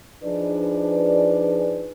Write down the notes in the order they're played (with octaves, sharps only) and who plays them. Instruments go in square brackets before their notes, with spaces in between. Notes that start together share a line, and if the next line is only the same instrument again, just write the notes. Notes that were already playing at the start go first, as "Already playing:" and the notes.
[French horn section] F3 D4 D#4 G#4 B4 D5